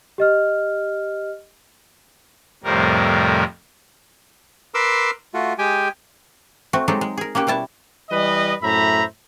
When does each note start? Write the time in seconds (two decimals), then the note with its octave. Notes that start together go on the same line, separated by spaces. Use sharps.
0.18 G4 D#5 F6
2.64 F2 A2 C3 G3 A#4
4.74 A#4 B4 C6 D6 E6
5.34 A3 F4 F#4
5.58 G#3 G4 G5 G#5
6.73 A3 C4 F#4
6.88 F#3 G#3 C4 D#4 G4 A4
7.01 G#3
7.17 G#4 A#4
7.35 A#3 C#4 F#4 G4
7.47 B2 G3 E4 A5
8.10 E3 G3 B4 D#5
8.62 F#2 A2 C5 E5 A#5 B5